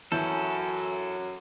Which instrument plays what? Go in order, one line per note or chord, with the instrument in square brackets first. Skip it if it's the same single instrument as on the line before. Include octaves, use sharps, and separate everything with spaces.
[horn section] F#2 F#3 [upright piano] E3 G6 [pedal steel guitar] C#4 E4 A4